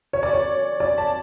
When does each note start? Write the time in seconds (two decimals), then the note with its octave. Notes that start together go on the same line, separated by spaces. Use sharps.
0.13 C#5
0.23 D5
0.33 C#5
0.80 D5
0.98 A5